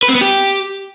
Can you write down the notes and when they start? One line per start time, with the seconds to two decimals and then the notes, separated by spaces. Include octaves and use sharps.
0.03 B4
0.09 C4
0.15 B3
0.21 G4